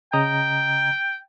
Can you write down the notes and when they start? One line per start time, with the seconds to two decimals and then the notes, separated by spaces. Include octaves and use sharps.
0.13 C#3 D#5 G5 A#5